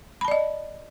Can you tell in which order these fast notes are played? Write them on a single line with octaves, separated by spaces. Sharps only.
B5 A5 D5 D#5